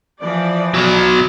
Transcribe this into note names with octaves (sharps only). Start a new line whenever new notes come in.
E3 F3 D5
B2 F#3